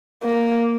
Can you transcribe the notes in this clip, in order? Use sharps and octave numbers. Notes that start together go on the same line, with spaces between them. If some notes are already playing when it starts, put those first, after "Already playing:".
A#3